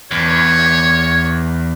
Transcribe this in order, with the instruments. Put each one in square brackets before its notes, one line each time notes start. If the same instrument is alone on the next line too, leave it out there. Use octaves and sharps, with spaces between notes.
[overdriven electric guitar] E2 [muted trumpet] C#5